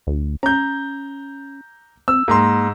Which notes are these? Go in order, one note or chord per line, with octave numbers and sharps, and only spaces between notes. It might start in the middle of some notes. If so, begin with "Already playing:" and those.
D2
C#4 A#5 G6
C4 E6
G#2 A#3 A#5 C6